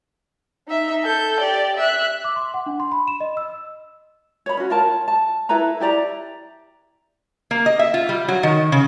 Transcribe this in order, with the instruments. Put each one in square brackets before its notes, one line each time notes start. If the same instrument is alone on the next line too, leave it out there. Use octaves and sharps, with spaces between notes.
[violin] D#4 E5
A4 G6
G4 D5
E5 F#6
[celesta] D6
C6
F#5
D4
C6
B5
E7
D#5
E6
[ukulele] C#5 B5
C#4 F#4
F4 A#4 A5
A5
E4 A4 B4 A#5
E4 G4 D5 A#5
[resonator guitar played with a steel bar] A#3
D#5
E5
F4
G3
F#3
D#3
C#3